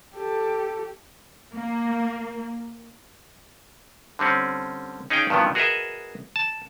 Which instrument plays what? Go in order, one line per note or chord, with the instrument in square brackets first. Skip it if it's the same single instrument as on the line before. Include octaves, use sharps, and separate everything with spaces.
[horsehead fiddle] G4 A4
[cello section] A#3
[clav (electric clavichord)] D3 G3 C4 C#4
C#4 D#4 G#4 F5 G5
G2 B2 D#3 F3 F#3 B3
F#4 G#4 A#4 B4 D#5 E5
A5